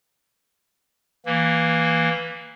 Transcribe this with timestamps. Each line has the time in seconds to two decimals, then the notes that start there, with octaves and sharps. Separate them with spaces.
1.26 E3 A#3